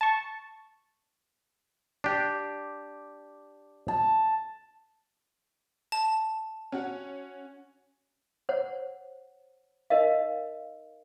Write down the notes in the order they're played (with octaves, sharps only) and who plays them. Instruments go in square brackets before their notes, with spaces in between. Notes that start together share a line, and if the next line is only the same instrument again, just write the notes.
[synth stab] A5 C#6
[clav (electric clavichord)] D4 G4
[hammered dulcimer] A5
[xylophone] A5
[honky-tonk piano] C#4 F#4
[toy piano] C5 C#5 F#5
D#4 A#4 D#5 F5